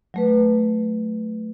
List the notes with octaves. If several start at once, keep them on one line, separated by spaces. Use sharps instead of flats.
F#3 A3 B4